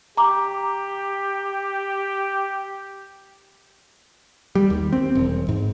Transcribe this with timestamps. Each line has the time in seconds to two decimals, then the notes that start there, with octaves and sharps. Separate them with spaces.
0.17 G4 A#5 D6
4.55 G3
4.70 D#2
4.93 C4
5.15 E1
5.49 G#2